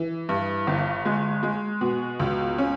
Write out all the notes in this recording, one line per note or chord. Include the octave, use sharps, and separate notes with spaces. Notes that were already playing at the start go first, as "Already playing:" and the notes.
Already playing: E3
G2
G1
G#3
G#3
B2
C#2
C#4